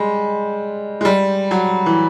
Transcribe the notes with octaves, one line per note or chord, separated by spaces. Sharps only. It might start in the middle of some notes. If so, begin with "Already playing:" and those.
Already playing: G3 G#3
G#3
G3
F#3
E3